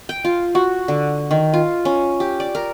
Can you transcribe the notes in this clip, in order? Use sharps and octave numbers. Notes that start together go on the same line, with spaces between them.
G5
F4
F#4
D3
D#3
F4
C#4
G4
D5
A#4